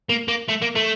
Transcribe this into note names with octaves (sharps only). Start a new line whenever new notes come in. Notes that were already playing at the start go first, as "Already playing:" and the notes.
A#3
A#3
A3
A#3
A3